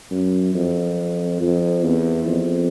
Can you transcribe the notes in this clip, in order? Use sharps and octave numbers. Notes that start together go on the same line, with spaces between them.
F#2
F2
F2
E2
F2